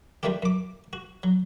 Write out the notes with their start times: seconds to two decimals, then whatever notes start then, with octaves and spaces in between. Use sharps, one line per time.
0.23 D#3 G3 A3 D4 F4 G4
0.42 F#2 D6
0.93 F#4
1.23 F#3